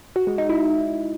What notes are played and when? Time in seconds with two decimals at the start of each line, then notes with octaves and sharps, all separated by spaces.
0.16 F#4
0.27 G#3
0.38 D#4
0.49 E4